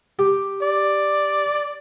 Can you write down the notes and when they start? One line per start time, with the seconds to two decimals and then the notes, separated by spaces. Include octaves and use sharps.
0.19 G4
0.62 D5